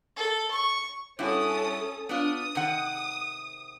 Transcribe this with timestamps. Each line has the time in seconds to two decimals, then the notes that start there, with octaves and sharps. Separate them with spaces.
0.17 A4
0.52 C#6
1.19 G2 C#4 E4 F#4 A4 D#6
2.09 B3 D4 F4 D#6
2.55 C3 D#3 F#5